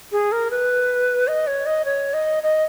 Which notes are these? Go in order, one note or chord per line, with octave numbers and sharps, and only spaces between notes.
G#4
A#4
B4
D#5
C#5
D#5
C#5
D#5
D#5